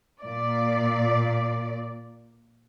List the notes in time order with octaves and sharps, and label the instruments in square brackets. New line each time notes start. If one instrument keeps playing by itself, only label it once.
[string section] A#2 D5